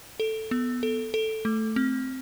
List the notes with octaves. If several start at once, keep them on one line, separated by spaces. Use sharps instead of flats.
A4
B3
A4
A4
A3
C4